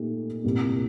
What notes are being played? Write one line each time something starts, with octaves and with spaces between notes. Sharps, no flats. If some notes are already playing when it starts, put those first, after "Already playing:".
Already playing: A#2 A3 D#4 G4
C2 A#2 G3